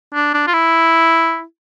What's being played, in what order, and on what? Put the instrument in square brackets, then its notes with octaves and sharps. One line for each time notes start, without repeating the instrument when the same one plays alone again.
[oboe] D4
D4
F4
E4